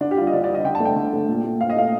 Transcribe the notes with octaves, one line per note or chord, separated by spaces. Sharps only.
D3 D4
G4
G3 F4
D#5
D3 D5
D5
G3
D#5
D3 G5
A5
A3
G5
D3
A3
A#2
A3
A#2 F5
D#5
A3 F5